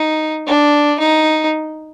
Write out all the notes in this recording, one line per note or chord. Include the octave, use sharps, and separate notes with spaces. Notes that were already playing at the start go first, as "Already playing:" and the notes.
Already playing: D#4
D4
D#4